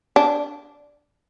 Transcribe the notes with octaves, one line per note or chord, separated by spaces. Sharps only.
D4